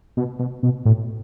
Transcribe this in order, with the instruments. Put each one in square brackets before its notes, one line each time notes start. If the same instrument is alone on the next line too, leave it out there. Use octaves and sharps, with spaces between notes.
[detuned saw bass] B2
B2
B2
A2